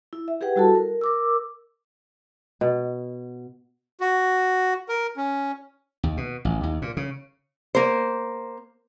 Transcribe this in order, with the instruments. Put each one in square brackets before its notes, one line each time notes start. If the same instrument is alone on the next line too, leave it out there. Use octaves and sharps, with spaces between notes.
[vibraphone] E4
E5
G4 G#4 B4 F#5 G5
G3 E4 F#4 A4 A5
A#4
A#4 D6 E6
[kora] B2
[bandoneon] F#4
A#4
C#4
[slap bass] D#2
B2
A1
D#2
A#2
C#3
[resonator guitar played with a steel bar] A#3 C5